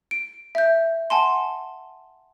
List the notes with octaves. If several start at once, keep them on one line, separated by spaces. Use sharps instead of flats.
D7
E5 G6
F#5 G#5 A5 C6